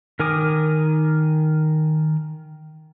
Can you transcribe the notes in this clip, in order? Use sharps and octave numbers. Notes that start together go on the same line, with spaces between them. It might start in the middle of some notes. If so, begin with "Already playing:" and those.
D#3 A#4 G#5 D6 D#6